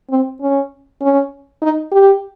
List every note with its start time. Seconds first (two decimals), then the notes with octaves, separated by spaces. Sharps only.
0.10 C4
0.41 C#4
1.01 C#4
1.62 D#4
1.91 G4